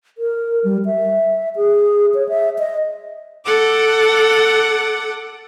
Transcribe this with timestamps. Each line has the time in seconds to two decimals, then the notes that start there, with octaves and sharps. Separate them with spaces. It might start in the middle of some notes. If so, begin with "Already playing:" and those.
0.18 A#4
0.64 G3
0.86 E5
1.56 G#4
2.14 C#5
2.29 E5
2.59 D#5
3.44 A4 F#5 D6